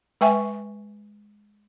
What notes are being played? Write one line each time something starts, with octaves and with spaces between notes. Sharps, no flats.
G#3 B4 E5 G5 G#5 C#6